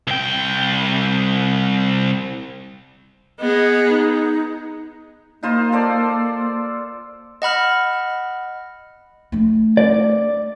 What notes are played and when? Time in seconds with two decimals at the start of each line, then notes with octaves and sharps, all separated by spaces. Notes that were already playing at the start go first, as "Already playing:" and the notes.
0.07 C2 G5
3.40 B3 G#4 D#5
3.89 D#4
5.43 A#3 D#4 F4 C5
5.72 A4 C5 D5
7.42 D#5 F#5 B5 F6
9.32 A3 D4
9.77 D5